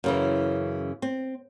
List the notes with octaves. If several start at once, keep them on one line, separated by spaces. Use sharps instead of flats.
F#2 C#3 E3
C4